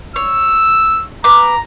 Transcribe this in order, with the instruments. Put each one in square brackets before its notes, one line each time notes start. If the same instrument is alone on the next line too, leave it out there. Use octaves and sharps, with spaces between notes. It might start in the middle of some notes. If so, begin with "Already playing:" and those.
[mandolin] C#5 [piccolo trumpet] E6
[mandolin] B4 D6 [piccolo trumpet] A#5